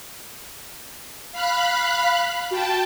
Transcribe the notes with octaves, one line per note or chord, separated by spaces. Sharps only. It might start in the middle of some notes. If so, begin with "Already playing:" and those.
F5 B5 F#6
F#4 G5 A5